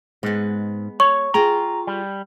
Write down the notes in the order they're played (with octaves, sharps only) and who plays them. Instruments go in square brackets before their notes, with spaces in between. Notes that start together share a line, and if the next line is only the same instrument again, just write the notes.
[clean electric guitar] G#2 [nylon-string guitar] G#3 B3
[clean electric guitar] C#5 [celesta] C#6
[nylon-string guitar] F4 G#4 G5 [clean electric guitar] A#5
[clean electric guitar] G3